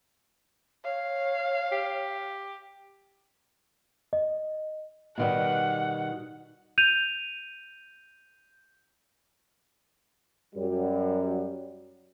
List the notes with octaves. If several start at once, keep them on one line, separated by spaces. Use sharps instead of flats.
C#5 F5
G4
D#5
B2 D#3 G3 F#5
G6 D#7 F7
F#2 F#3 G3